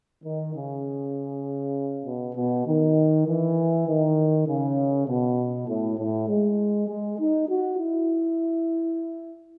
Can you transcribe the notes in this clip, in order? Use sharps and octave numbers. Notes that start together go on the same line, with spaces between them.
D#3
C#3
B2
B2
D#3
E3
D#3
C#3
B2
A2
A2
G#3
G#3
D#4
F#4
E4